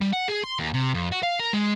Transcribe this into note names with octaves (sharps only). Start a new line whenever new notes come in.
G3
F#5
G#4
C6
D#2
C3
F2
F#4
F5
A#4
G#3